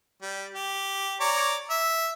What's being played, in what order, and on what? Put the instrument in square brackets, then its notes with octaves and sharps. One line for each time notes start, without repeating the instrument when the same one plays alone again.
[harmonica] G3
G4
C#5 D5 A#5
E5